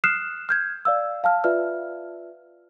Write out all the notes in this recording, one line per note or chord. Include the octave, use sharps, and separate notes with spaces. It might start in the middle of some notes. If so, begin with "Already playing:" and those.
D#6 F6 F#6 C7 E7
F6 G6 G#6
D5 F5 E6
F5 A5 F6
F4 B4 D5 E5 F6